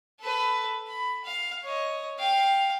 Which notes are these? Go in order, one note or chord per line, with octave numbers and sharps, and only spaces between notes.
A4 B4
B5
F5
C#5 D#5
F5 G5